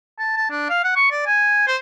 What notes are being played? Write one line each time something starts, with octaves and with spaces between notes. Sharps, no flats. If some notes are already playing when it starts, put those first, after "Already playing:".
A5
A5
D4
F5
F#5
C#6
D5
G#5
C5